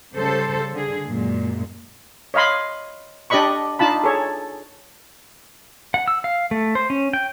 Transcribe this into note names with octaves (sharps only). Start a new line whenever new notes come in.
C#3 G3 A4 C5
D3 G#4
F#2 A#2 G#3
C#5 D#5 F5 B5 C6
D4 G4 D5 D#5 B5 C#6
D4 D#4 F4 A5 B5
G#4 A4 C#5
F#5
E6
F5
A3
C5
C#4
G5